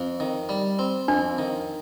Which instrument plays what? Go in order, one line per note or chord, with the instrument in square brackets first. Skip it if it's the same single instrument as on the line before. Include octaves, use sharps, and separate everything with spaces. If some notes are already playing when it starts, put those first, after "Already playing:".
Already playing: [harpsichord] F2
D#3
G3
C4
[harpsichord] F2 [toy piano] D4
[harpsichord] D#3